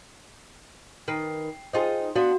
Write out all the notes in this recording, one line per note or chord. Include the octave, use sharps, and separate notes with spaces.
D#3 B4 G5 C7
D#4 F4 G#4 C5 D#5 G5
B3 D4 F#4 F5 F#5 C6